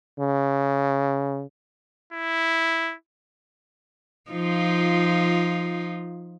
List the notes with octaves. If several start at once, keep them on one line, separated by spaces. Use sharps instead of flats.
C#3
E4
F3 D#4 F4